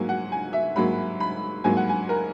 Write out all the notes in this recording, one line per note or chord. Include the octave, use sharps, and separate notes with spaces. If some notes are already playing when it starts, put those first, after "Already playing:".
Already playing: G#2 F#3 A#3 G#5
F#5
G#5
E5
G#2 F#3 A#3 B5
B5
G#2 F#3 A#3 G#5
F#5
G#5
A#4